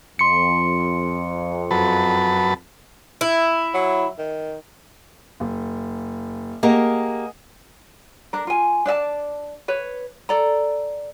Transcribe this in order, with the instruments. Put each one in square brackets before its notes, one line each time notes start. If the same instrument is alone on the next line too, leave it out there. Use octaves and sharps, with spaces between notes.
[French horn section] F2 [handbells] C6 C#7
[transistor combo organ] F#2 B4 A5
[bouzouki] E4
[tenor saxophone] F#3
D#3
[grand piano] F#1
[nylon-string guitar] A#3 G4 A#4 [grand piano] G#4 D#5 F#5
[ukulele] D4 A#4
F4 G#5
D4 D5 E5 A5
B4 C#5
A4 D5 A#5